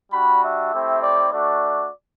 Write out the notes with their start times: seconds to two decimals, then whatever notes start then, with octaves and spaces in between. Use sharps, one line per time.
0.12 G3 D4 F#4 B5
0.42 E5
0.71 A3 C4 E4 G4
1.01 D5
1.30 A3 D4 F#4 D5